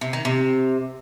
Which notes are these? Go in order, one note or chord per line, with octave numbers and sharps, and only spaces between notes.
C3
D#3
C3